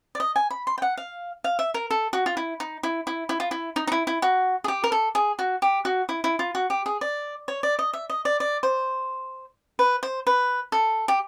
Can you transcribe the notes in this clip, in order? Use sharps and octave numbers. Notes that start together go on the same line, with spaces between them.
D5
D#5
G#5
B5
C6
G5
F#5
F5
F5
E5
A#4
A4
F#4
F4
E4
D#4
E4
E4
E4
F4
E4
D#4
D#4
E4
E4
F#4
G#4
G4
A#4
A4
G#4
F#4
G4
F#4
E4
E4
F4
F#4
G4
G#4
D5
C#5
D5
D#5
E5
D#5
D5
D5
C5
B4
C5
B4
A4
G4